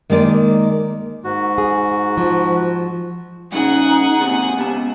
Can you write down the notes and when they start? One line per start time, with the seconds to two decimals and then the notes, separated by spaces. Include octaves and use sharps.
0.10 D#3 G#3 A#3 D5
1.24 G#2 F#4
1.58 G#4
2.18 F3
3.52 G2 C#3 D#4 G#4 F#5
4.21 D#2 C3
4.57 C#2 B3 G4 A5